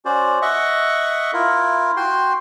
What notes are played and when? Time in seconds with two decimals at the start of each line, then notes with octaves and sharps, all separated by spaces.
0.05 C#4 F#4 C5 D5
0.42 D#5 E5 F#5 C#6
1.34 E4 F4 A#4
1.97 F#4 G5 C6